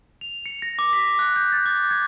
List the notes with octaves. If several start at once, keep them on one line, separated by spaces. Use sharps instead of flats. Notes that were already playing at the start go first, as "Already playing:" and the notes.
F7
C#7
A#6
D6
B6
F#6
G6
A6
D6
G#6